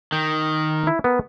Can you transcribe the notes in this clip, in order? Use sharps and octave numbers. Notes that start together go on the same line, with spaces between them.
D#3 G5
E4
B3 A#4